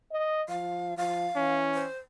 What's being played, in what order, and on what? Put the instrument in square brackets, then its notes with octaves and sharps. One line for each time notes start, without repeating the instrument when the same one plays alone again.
[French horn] D#5
[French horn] F3 [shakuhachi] F5
[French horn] F3 [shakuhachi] F5
[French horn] E3 [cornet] C#4
[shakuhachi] C5